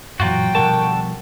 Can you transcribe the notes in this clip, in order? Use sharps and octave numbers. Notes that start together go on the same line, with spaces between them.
F#2 A#2 E3 F#3 F4 F#4 G5
B2 D3 F3 G3 A#4 F#5 A5 C#6